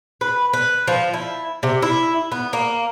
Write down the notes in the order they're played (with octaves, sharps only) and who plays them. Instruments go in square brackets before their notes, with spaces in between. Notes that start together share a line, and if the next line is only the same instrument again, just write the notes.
[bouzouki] B4
B4
F3
E4
C3
E4
B3
A#3